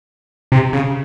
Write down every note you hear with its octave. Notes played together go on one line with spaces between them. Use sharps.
C3
C#3